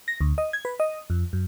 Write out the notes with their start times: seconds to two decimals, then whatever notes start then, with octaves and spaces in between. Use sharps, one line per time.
0.08 A#6
0.21 D2
0.38 D#5
0.53 G#6
0.65 B4
0.80 D#5
1.10 F2
1.33 F#2